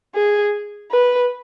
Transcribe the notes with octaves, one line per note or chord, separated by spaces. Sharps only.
G#4
B4